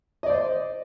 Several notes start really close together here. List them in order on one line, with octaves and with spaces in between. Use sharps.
D#5 D5 C5